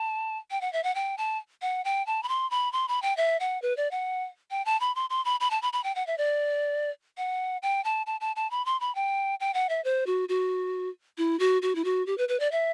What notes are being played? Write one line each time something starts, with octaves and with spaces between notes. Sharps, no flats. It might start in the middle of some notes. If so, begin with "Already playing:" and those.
Already playing: A5
G5
F#5
E5
F#5
G5
A5
F#5
G5
A5
B5
C6
B5
C6
B5
G5
E5
F#5
B4
D5
F#5
G5
A5
B5
C6
C6
B5
B5
A5
B5
B5
G5
F#5
E5
D5
F#5
G5
A5
A5
A5
A5
B5
C6
B5
G5
G5
F#5
E5
C5
F#4
F#4
E4
F#4
F#4
E4
F#4
G4
B4
B4
D5
E5